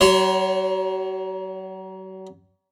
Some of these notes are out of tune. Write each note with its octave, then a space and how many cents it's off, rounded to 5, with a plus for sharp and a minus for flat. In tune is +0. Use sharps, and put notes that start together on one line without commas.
F#3 +40 C#5 +0 C6 -30